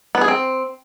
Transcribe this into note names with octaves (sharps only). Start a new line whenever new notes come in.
B3
G#4
C4